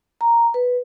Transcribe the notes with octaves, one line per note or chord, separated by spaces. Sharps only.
A#5
B4